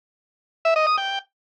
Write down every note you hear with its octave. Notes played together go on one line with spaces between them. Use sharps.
E5
D#5
D#6
G5